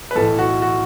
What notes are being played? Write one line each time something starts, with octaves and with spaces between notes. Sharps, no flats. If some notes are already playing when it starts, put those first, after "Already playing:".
B4
B1 A2 E3 A4
F#4
F#4